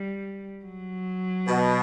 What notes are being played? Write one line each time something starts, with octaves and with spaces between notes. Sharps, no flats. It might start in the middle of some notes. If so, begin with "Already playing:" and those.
Already playing: G3
F#3
B2